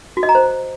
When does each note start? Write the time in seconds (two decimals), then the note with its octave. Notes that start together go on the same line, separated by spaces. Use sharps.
0.17 F#4
0.23 D#5
0.29 A#5
0.35 C5